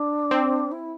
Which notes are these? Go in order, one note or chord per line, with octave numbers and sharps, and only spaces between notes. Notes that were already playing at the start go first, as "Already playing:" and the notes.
Already playing: D4
C4
E4